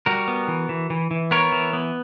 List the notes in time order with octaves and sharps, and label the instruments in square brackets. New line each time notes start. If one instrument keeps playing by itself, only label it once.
[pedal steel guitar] G3 F#4 A#4
B3
E3
E3
E3
E3
B3 A#4 C#5
E3
B3